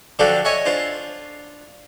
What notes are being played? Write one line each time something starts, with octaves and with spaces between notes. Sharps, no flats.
D3 F3 D4 F#4 G4 A4
C#5 D#5 E5 G#5 C#6
D4 F4 C5